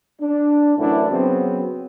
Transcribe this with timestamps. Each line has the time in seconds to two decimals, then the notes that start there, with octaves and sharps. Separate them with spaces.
0.21 D4
0.78 F#2 A2 E3 D4 E4 F#4
1.09 C#3 F#3 B3 C4